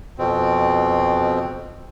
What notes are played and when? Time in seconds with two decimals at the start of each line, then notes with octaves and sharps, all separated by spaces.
0.18 F2 B2 C4